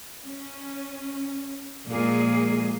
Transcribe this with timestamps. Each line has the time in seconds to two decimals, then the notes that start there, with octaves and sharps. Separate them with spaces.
0.23 C#4
1.89 A#2 F3 G#3 A#3 G#4